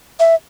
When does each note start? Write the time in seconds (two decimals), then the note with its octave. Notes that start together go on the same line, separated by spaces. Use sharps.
0.20 E5